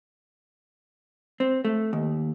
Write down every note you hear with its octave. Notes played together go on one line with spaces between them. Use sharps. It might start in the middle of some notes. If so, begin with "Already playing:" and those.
C4
A3
D#2